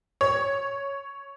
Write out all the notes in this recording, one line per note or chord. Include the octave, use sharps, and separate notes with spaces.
C#5